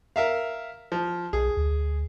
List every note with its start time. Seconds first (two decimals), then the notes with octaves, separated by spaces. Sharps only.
0.16 A#4 E5 F5
0.92 F3
1.33 B1 G#4
1.57 D2